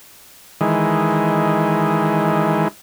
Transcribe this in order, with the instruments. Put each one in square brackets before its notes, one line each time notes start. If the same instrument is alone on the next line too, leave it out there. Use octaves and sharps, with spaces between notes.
[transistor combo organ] D#3 E3 G#3